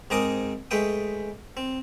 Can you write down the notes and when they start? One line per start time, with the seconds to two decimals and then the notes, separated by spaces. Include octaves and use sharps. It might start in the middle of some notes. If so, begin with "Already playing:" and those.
0.10 G#2 C4 G#4 A#4 D6 D#6
0.71 G#3 A3 B4 G5 D#6
1.57 C4